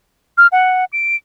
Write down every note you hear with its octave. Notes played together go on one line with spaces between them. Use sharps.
F6
F#5
D7